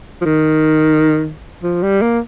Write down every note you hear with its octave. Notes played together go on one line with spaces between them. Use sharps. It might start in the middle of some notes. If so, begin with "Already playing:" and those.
F3
D#3
F3
G3
A#3